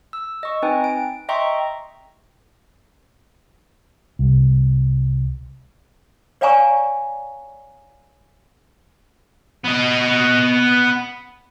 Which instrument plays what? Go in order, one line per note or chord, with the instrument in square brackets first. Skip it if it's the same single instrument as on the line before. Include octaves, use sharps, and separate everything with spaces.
[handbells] E6
D#5 C#6
C4 D#4 B4 G5 G#5
D7
D#5 E5 G5 A#5 C6 C#6
[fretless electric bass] C2
[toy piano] C#5 D5 F5 G#5 A#5 C#6
[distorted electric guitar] B3 D#5